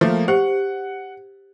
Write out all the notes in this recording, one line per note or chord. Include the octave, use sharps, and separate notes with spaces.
F3 A3 A#3
G4 C5 F#5